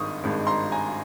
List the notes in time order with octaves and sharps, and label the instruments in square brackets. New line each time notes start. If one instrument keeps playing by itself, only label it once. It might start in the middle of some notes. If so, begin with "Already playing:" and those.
Already playing: [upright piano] G#1 G2 D#3 G#3 C#6 D#6
G#1 G2 D#3 G#3
A#5 C6
G#5 A#5